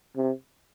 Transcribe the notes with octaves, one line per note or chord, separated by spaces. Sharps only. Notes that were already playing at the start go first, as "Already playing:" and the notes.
C3